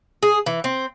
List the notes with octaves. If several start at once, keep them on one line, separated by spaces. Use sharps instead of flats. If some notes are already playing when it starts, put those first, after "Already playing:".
G#4
E3
C4